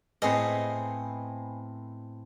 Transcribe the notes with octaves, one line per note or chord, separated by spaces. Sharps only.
A2 B3 C4 G#4 D#5